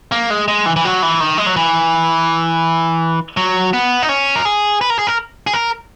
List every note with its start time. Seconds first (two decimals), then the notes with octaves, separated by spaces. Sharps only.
0.11 A#3
0.30 G#3
0.48 G#3
0.66 E3
0.76 E3
0.85 F#3
1.03 E3
1.20 D#3
1.38 G#3
1.46 F#3
1.56 E3
3.37 F#3
3.73 B3
4.03 D#4
4.09 C#4
4.36 A#4
4.45 G#4
4.81 B4
4.90 A#4
4.99 G#4
5.07 A#4
5.47 G#4
5.53 A#4